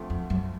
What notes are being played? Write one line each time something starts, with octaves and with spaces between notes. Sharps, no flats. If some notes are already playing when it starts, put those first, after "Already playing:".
Already playing: D2 D3 F3 A3 C4
F2
F#2